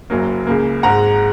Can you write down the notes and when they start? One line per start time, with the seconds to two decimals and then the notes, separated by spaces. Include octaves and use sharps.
0.10 F#1 F#2 F#3 A#3
0.47 C#2 C#3 A#3
0.83 G#1 G#2 G#3 F#5 A#5